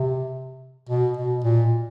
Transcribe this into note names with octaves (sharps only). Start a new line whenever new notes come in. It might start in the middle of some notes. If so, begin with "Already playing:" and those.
Already playing: C3
B2
B2
A#2